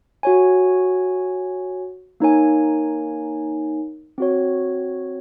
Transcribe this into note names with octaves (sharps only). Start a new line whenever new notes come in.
F#4 C#5 G#5
A#3 D#4 A#4 C#5 G#5
C4 F#4 C#5